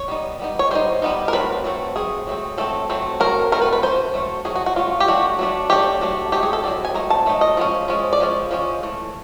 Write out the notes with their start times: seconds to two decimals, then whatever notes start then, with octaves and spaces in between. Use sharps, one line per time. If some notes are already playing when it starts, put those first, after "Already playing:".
Already playing: C#5
0.08 G3 B3 D#4
0.39 G3 B3 D#4
0.59 C#5
0.71 G3 B3 D#4 C5
1.02 G3 B3 D#4
1.28 A#4
1.33 F#3 A3 C4 B4
1.64 F#3 A3 C4
1.96 F#3 A3 C4 G#4
2.27 F#3 A3 C4
2.58 F#3 A3 C4 A4
2.90 F#3 A3 C4
3.20 F#3 A3 C4 A#4
3.52 F#3 A3 C4 A#4
3.62 B4
3.72 B4
3.83 F#3 A3 C#4 C5
4.14 F#3 A3 C#4
4.45 F#3 A3 C#4 G#4
4.55 F#4
4.66 F#4
4.76 F#3 A3 C#4 F4
5.00 G4
5.08 F#3 A3 D4 F#4
5.39 F#3 A3 D4
5.70 F#3 A3 D4 G4
6.01 F#3 A3 D4
6.32 F#3 A3 C4 D#4 G4
6.43 G#4
6.53 A4
6.63 F#3 A3 C4 D#4 D5
6.85 G#5
6.94 F#3 A3 C4 D#4 A#5
7.10 A5
7.26 F#3 A3 D#4
7.41 D#5
7.57 F3 G#3 C#4
7.88 F3 G#3 C#4
8.13 D5
8.20 F3 G#3 C#4
8.51 F3 G#3 C#4
8.83 E3 A3